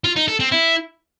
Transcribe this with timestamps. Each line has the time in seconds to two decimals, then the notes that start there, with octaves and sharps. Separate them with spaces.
0.04 F4
0.16 D#4
0.28 A4
0.40 C4
0.52 E4